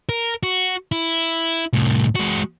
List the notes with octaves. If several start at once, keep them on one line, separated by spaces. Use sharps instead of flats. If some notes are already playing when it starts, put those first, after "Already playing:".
A#4
F#4
E4
C2 A2
G#3 F#4